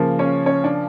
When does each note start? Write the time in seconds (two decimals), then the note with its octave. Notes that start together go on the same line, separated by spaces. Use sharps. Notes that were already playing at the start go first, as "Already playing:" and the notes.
Already playing: C#3 F3 A#3
0.19 C#4 C#5
0.46 C#4 C#5
0.64 D4